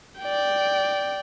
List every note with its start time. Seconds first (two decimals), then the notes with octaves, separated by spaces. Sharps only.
0.21 D5 G5